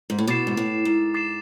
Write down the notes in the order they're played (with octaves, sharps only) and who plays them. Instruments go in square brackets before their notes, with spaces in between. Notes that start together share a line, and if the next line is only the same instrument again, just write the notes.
[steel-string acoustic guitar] G#2
A2
[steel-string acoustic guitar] B2 [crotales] D6 A6 C7 E7
[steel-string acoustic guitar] G#2
A2
G#2
[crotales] D6 A6 C7 E7